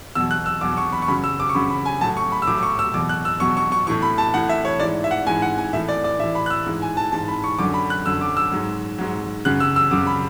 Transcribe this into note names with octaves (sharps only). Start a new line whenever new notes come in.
E2 B2 F#3 E6
F#6
E6
E2 B2 F#3 D6
C#6
B5
C#6
F#2 C#3 F#3 B5
E6
D6
C#6
F#2 C#3 F#3 B5
B5
G#5
A2 F#3 A5
C#6
B5
E6
A2 F#3 D6
D6
C#6
E6
E2 B2 F#3 D6
F#6
E6
E2 B2 F#3 C#6
C#6
C#6
A2 E3 C#6
B5
A5
A2 E3 F#5
E5
C#5
G#2 E3 D5
E5
F#5
G#2 E3 G#5
F#5
G#5
A2 E3 E5
D5
D5
A2 E3 E5
B5
F#6
E6
G#2 E3
G#5
A5
G#2 E3 A5
B5
C#6
F#2 D3 F#3 D6
B5
F#6
F#2 D3 F#3 E6
D6
E6
G#2 F#3
G#2 F#3
F#2 C#3 F#3 F#6
E6
E6
F#2 C#3 F#3 D6
B5